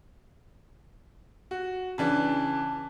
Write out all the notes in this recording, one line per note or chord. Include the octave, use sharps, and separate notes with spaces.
F#4
C#3 E3 D4 A5